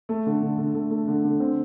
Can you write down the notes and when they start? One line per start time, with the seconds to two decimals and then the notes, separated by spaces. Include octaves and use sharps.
0.09 A3
0.26 D3
0.43 D3
0.58 D3
0.75 A3
0.91 A3
1.08 D3
1.24 D3
1.40 C4